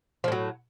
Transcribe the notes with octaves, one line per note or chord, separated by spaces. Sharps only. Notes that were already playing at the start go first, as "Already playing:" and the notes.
A2 F3 F#3